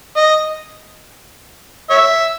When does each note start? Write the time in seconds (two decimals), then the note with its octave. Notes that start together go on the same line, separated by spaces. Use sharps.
0.17 D#5
1.90 C#5 E5